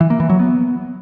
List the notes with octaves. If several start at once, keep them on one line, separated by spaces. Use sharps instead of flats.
E3
A#3
E3
F#3
B3